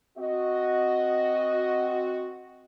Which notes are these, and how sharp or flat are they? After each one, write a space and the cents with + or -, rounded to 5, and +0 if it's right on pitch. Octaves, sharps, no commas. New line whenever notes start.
C4 +0 F#4 +0 D#5 +0